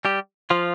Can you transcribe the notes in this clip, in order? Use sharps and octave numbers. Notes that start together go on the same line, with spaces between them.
G3 G4
F3 F4